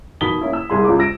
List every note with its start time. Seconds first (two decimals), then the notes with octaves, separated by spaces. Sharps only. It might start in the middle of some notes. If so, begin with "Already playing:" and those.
0.21 B2 D#3 B5 D#6 B6 G7
0.41 A#3 C#4 E4
0.53 E6
0.70 C2 G#4 C6
0.84 C#2 D6
0.99 E6 A#6 D7